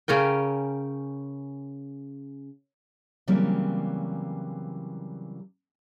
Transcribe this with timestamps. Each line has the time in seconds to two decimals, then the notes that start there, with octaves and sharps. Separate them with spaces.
0.08 C#3 C#4 A#4 G5
3.27 C#3 E3 F#3 G3 A#3 C4